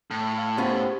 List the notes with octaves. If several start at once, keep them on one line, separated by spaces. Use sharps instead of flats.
A2
F5
B3 C#4 F4 G4 C5